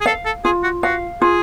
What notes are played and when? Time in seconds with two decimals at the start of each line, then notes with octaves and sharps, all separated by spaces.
0.01 G#4
0.06 A4 F5
0.25 A4
0.45 F4 G#4
0.63 F#4
0.83 F#4 F5
1.22 F4 G#4